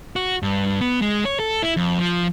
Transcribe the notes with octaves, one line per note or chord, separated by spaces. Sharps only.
F#4
G2
B3
G#3
C#5
A4
E4
F2
F3